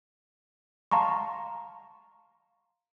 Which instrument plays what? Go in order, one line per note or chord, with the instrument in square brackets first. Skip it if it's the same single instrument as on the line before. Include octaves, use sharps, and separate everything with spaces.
[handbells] F5 A5 A#5 C6 C#6